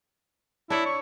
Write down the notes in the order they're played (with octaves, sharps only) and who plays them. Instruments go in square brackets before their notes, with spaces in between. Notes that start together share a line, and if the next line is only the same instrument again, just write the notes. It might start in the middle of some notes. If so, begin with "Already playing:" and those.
[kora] D4 C#5 [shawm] E4
[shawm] C#6